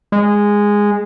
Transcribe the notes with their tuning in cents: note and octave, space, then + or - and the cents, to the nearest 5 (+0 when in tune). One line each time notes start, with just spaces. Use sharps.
G#3 -10